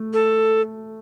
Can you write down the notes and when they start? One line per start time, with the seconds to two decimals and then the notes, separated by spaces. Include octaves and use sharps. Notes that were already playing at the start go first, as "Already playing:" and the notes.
Already playing: A3
0.13 A4